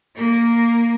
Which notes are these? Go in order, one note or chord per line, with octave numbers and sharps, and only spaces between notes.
A#3